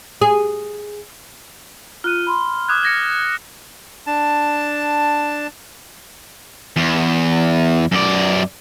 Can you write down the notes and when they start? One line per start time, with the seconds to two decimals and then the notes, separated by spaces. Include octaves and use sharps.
0.21 G#4
2.04 F4 F6 F#6 D#7
2.27 B5 C6
2.69 D6 D#6 F#6 G#6
2.83 F6 G#6 A#6 C#7
4.07 D4 A5
6.76 E2
7.92 F#2 D5